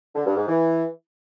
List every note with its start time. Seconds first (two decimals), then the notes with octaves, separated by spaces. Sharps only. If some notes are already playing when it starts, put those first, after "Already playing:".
0.15 D3
0.26 G2
0.37 G#2
0.48 E3